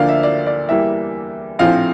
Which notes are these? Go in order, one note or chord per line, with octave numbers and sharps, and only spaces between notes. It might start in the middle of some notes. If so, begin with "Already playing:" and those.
Already playing: D2 D3 F3 A#3 D4 F5
E5
D5
D5
E2 E3 G3 A#3 E5
A#1 A2 F3 C4 F5